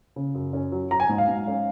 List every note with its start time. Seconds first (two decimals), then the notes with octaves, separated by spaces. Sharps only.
0.16 C#3
0.35 F#2
0.53 C#4
0.72 F#3
0.91 F#3 A#5
1.00 G#5
1.09 G#2
1.18 F5
1.28 G#2
1.47 C#4